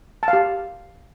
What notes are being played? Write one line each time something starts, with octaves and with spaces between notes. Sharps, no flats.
A5
F5
G4